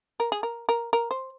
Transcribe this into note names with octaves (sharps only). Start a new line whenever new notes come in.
A#4
G#4
A#4
A#4
A#4
C5